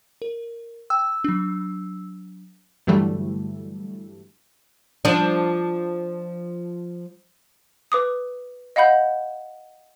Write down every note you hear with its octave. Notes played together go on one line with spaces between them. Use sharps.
A#4
G5 E6
F#3 D4
G2 D3 E3 F#3 G3 A3
F3 D4
B4 D6 D#6
D#5 F5 F#5 B5 G6